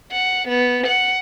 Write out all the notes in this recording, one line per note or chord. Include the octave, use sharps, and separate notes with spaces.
F#5
B3
F#5